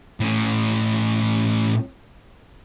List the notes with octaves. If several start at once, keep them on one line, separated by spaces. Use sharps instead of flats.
A2 C#4